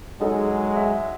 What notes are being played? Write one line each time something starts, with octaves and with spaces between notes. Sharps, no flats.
F#3 G#3 D#4 G#4 A4
E5